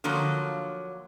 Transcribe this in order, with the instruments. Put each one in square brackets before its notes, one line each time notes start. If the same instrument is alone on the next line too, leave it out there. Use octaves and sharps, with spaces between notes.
[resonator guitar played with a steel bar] D3 F3 F#3 A#3